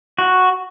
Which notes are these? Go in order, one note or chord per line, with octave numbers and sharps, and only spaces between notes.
F#4